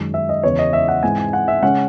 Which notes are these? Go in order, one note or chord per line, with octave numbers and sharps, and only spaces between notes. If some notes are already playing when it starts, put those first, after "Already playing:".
Already playing: F#2 D#3 G#3
E5
D#5
E2 C#3 E3 C#5
D#5
E5
F#5
G#2 E3 G#3 C4 G#5
G#5
F#5
E5
C#3 G#3 C#4 F#5